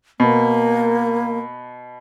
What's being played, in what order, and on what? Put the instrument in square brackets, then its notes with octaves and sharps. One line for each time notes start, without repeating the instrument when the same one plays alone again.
[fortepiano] B2 [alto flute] A#3